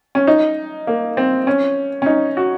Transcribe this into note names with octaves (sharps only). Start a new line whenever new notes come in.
C#4
D#4
A#3
C4
C#4
C#4
D#4
F#4